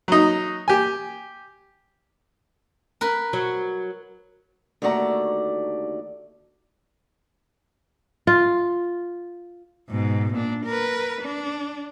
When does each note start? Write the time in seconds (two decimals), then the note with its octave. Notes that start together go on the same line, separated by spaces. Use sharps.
0.08 F#3 D#4
0.68 G4 G#5
3.01 A#4 B4
3.33 F#3
4.82 D#2 D3 A3 F#4 D5 A#5
8.27 F4
9.89 G#2 B2
10.33 A#2 D4
10.65 A#4 B4
11.21 D4